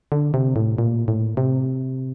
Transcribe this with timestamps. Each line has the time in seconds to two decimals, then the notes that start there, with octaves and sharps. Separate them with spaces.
0.12 D3
0.34 C3
0.56 A2
0.78 A#2
1.08 A2
1.37 C3